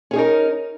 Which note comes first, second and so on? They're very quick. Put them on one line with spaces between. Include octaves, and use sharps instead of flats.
C#4 G#4 D#4 A#4